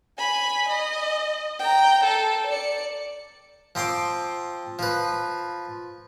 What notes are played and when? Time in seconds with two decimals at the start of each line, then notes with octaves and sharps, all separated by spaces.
0.18 G#5 B5
0.69 D#5
1.60 G5 A#5
2.04 A4
2.46 D5 C#7
3.75 F3 C4 G5 C6 D6
4.79 F3 B4